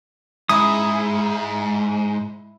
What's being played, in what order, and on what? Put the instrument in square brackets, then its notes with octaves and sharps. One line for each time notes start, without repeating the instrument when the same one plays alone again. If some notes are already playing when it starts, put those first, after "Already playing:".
[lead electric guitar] G#2 [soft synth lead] G#3 [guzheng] E4 [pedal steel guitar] D#6